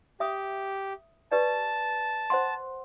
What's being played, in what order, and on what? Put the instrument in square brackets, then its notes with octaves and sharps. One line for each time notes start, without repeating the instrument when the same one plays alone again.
[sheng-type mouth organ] G4 [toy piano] E5 D#6
[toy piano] G4 B4 D5 [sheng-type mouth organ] A5
[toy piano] C5 F#5 C6